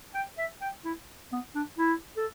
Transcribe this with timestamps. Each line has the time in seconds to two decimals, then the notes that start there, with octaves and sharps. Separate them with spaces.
0.14 G5
0.38 E5
0.61 G5
0.84 E4
1.32 B3
1.55 D4
1.78 E4
2.16 A4